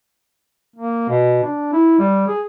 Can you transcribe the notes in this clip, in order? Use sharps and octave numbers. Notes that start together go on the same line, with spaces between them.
A#3
B2
D4
E4
G3
G#4